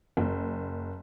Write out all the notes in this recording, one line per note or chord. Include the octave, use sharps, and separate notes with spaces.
F#1